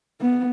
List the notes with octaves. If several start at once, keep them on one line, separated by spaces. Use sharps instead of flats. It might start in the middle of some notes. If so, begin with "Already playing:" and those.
B3